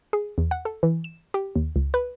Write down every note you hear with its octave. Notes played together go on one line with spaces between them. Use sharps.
G#4
E2
F#5
A4
E3
E7
G4
D#2
C#2
B4